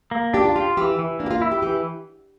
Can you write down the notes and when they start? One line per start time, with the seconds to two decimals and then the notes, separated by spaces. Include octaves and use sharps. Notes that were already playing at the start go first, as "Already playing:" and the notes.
0.11 A#3
0.33 D4 G4
0.45 F4
0.56 F4 G4
0.77 E3 G4
0.99 E3
1.19 A#3 D4
1.26 G4
1.31 F4
1.42 E4
1.52 G4
1.62 E3 G4